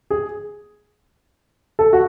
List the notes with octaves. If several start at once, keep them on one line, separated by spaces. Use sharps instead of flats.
G#4
A4
F#4